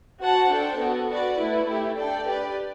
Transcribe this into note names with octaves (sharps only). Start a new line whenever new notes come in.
F#4 C5 F#5 A5
D4 A4 C5 G5
B3 F#4 A4
F#4 B4 D5
A3 E4 B4
A3 E4 G4
D4 A4 D5 G5
G4 B4 D5